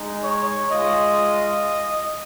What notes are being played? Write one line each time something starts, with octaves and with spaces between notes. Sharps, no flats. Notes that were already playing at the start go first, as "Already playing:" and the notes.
Already playing: G#3 D#4
C#5
G#3 F4 D#5